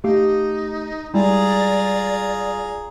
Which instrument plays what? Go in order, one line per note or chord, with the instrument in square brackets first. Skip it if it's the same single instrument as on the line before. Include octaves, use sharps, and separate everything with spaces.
[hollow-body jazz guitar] A3 G4 F5 [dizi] D#4
[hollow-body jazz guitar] G3 G#3 E4 [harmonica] F4 G#4 A#5 [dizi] D5